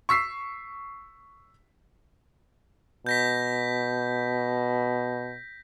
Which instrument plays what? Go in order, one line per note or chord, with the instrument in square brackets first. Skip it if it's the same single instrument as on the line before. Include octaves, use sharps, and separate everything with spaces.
[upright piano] C#6 E6 B6 C7
[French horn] B2 [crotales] G6 A#6 B6